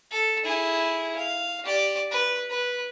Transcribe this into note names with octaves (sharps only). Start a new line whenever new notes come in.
A4
E4 G#4
F5
G4 D5
B4
B4